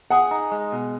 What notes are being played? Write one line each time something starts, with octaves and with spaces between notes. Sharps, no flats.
G#4 F#5
D#4
G#3
B2